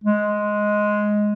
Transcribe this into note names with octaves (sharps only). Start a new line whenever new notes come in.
G#3